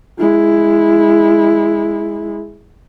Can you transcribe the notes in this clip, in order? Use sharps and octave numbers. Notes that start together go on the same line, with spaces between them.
G#3 E4